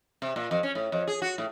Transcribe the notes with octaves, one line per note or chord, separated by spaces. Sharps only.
C3
A#2
F2
C#4
A2
F2
G#4
F#4
A2